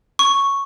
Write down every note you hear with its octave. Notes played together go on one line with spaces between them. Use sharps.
C#6